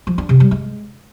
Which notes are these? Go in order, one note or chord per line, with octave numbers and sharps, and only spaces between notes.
F3
D4
C3
G3
G#3